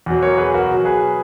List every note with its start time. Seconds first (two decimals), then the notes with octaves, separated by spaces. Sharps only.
0.06 E2 B2 F#3
0.22 A#4 C#5
0.37 G#4 B4
0.54 F#4 A#4
0.70 B2 F#3
0.85 G#4 B4